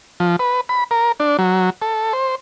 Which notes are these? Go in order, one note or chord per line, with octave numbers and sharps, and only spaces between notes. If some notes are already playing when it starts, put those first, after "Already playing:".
F3
B4
B5
A#4
D4
F#3
A4
C5